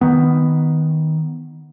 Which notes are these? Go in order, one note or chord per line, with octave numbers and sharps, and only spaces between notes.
D#3 B3